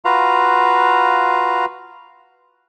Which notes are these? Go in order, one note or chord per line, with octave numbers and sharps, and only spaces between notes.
F4 F#4 B4 F5 A#5